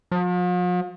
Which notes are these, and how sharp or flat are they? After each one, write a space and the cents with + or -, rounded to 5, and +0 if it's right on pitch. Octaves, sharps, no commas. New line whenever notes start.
F3 +45